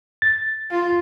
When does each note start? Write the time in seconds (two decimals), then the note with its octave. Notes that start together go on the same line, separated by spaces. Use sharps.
0.22 A6
0.71 F4